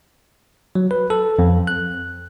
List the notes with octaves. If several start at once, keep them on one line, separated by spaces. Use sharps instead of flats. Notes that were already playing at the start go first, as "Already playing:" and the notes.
F#3
B4
A4
F2
F#6